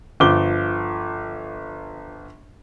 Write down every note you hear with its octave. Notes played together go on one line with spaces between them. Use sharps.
G1 F3 D6 G7